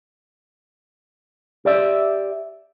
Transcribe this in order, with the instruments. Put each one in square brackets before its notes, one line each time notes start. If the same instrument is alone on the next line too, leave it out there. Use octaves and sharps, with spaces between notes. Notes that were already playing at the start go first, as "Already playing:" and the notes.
[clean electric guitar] G4 D5 E5